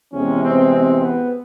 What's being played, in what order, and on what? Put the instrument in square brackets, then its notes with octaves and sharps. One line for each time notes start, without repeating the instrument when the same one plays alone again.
[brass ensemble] E2 C3 E3 G#3 C#4
C4
C4
B3